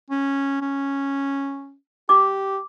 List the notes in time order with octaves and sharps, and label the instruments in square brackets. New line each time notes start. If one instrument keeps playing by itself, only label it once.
[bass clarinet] C#4
C#4
[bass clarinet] G4 [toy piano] D6